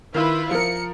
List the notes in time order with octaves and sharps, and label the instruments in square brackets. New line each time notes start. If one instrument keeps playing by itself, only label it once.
[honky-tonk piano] D#3 [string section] E4 F4 B4
[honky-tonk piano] F3 A#4 [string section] C#7